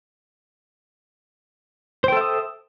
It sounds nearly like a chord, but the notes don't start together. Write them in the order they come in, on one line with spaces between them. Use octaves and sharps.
C5 G5 A4 E5 D#6